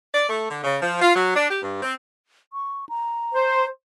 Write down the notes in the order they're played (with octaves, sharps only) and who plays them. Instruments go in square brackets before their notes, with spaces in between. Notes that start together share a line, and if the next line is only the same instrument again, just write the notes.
[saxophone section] D5
A3
D3
C#3
F3
F4
F#3
D4
G4
G2
C4
[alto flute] C#6
A#5
[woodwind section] C5